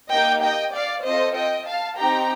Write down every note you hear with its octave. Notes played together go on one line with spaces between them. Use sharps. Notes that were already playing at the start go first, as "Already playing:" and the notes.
A#3 D#4 G4 D#5 G5
D#5 G5
D5 F5
C4 F4 A4 C5 D#5
D#5 G5
F5 A5
C4 D#4 G4 G5 A#5